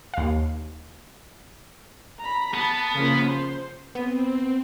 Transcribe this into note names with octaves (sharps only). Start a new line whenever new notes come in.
D#2 F5
A#5 B5
B3 A5
C#3 F3 A#3
C5
B3 C4